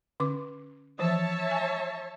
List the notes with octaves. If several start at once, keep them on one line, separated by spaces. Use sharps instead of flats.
D3 C#4 D6
E3 F3 C5 C#5 E5 A5
G#5